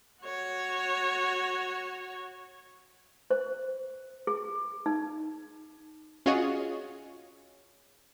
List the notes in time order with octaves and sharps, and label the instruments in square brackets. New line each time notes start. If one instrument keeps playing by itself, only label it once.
[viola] F#4 C#5
[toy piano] C5
G#4
D#4
[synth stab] C#4 F4 F#4 G#4 C#5 D#5